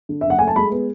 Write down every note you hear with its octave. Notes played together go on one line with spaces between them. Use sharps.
D3
F#1 E5
F#5
A3 G#5
A5
G#3 B5
B3